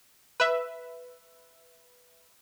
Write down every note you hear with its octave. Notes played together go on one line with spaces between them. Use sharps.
B4 E5